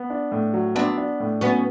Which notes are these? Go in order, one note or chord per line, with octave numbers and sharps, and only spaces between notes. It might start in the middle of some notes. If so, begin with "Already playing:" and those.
Already playing: B3
D4
A2
F#3
B3 C4 D4
D4
A2
F#3 B3 C#4